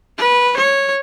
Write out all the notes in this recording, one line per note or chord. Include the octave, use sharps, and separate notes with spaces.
B4
C#5